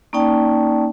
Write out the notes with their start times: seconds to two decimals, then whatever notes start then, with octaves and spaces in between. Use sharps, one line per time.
0.13 A#3 C#4 D#4 D5 G5 A5